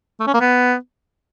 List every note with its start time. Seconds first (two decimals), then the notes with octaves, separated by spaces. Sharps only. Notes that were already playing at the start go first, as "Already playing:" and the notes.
0.20 A3
0.27 C#4
0.34 A#3
0.41 B3